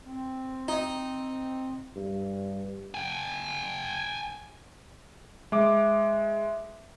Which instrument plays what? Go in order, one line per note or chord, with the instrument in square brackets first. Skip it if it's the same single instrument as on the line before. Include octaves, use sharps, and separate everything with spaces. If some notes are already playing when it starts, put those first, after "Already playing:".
[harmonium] C4
[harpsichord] D#4
[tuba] G2
[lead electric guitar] G5 G#5
[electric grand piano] G#3 D6 [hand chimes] E5